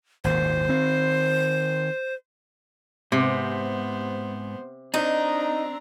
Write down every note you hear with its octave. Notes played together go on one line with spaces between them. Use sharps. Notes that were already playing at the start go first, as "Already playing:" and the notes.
G#1 D#2 A#2 C5
D#3 C4
G#2 C3 B3 C5
C4 D4 D#4 A#5